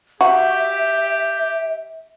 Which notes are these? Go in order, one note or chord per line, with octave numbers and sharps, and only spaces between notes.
F#4 G4 E5